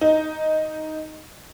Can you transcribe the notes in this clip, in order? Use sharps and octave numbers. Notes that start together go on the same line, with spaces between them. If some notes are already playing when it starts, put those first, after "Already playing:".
D#4